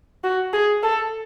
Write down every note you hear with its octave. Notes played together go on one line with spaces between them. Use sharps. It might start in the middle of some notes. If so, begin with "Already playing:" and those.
F#4
G#4
A4